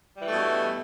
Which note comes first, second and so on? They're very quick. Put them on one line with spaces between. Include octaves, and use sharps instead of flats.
G3 E3 A3 B2 G2